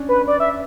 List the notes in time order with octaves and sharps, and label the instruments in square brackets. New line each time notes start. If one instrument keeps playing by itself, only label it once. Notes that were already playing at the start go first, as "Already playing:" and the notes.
Already playing: [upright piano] C#4 D4
[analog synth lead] B4
D5
E5